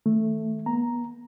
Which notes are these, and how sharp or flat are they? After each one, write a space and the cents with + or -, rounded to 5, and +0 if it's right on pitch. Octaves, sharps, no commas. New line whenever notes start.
D#3 +40 A3 +0
B3 -35 A#5 +0